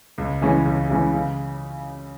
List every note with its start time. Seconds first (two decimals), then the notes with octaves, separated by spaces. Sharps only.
0.18 C#2
0.41 C#3 E3 G#3 C#4
0.65 C#2
0.89 C#3 E3 G#3 C#4
1.13 C#3